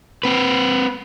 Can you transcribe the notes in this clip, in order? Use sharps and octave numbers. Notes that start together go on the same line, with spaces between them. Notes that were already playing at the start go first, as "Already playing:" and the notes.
C4 B4